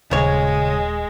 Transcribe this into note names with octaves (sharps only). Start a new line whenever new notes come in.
D#1 C#3 G#3 C#5